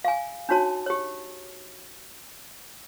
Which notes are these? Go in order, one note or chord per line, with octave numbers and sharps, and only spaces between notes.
F5 G#5
D4 D#4 F#4 C#5 A5
G4 C#5